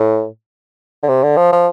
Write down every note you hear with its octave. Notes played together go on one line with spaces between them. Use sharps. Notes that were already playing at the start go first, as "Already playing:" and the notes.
Already playing: A2
D3
C3
D3
F3
F3